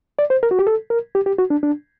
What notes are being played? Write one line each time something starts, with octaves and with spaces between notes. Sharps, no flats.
D5
C5
A#4
F#4
G4
A4
A#4
G4
G4
F#4
D4
D4